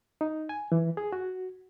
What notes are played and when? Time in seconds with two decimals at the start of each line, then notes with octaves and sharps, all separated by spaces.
0.21 D#4
0.49 G#5
0.72 E3
0.97 G#4
1.12 F#4